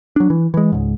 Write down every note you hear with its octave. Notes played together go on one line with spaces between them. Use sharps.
F#3 D4
E3
E3 G#3
C#2 G#2